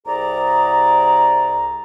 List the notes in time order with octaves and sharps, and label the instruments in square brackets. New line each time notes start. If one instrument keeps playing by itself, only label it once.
[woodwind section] C2 G#4 D5 A#5